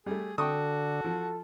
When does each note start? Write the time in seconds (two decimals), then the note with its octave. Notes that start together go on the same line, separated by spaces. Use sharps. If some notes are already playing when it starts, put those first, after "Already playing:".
0.06 G3 A3 G#4
0.38 D3 F#4 A4 G5 C#6 D#6
1.04 F3